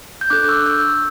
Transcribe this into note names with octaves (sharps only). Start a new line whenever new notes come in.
G6
D4 A4 D6 F#6
C#6 E6
E6 G6